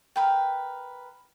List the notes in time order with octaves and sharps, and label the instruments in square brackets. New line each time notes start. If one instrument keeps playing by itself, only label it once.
[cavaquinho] A#4 B4 G5